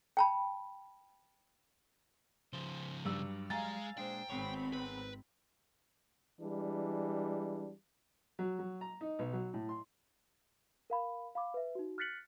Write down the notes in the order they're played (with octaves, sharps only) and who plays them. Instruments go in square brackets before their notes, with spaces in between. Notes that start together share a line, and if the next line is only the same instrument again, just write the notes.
[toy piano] G5 A5 B5
[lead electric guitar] C#3 F3 [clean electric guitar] C5
[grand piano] G2 E6 [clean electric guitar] F#3 G3 D5
[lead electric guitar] G#3 [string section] F5 [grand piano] G#5 A#5 A6
[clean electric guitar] A#2 G#3 D4 [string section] C5 [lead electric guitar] G5
[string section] G#1 C4 B5 [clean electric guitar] G#3 B3 C#5
[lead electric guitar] B4
[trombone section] E3 G3 G#3 D4
[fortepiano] F#3
F#3
A#5
D#4
B1
F#3
A2
C6
[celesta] A#4 F5 B5
F5 B5 D6
B4 E5
D#4 F#4
F6 F#6 A6 B6 C#7 F#7